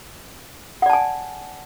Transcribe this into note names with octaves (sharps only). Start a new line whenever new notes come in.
D5 F#5 G#5 A5